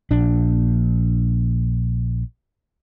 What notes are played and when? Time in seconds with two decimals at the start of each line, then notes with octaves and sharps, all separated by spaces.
0.11 A#1 D4